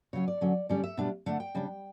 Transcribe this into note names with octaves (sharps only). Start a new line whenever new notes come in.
C#3 F#3 C#4 C#5
D5
D3 F#3 C#4
D3 G3 C#4 D5
E5
B2 G3 B3 D4
D3 A3 D4 F#5
G5
C#3 G3 D4